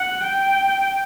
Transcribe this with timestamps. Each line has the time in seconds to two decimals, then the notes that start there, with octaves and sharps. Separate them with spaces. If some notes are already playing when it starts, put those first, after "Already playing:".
Already playing: F#5
0.23 G5